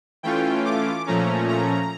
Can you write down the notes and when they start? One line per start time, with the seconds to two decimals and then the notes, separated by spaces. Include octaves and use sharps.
0.23 E3 A3 C#4 F4 G5
0.65 D6
1.06 A#2 F3 A3 C#4 A#5
1.49 A#5